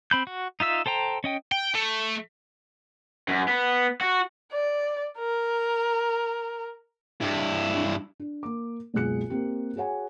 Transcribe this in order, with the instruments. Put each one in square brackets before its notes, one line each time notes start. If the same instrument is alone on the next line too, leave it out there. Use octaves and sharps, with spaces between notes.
[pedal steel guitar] C4 B5 G6
F#4
D#4 F4 E5 E6
A4 C5 G5 A#5
C#4 D#5 G5
[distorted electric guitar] G5
A3
[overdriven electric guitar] F#2
B3
F#4
[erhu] D5
A#4
[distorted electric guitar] G2 E4
[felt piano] D4
A#3 D6
F#1 C#2 B2 G#4 F#6 C#7
A#3 C4 G4
F#4 G#4 C#5 F#5 G#5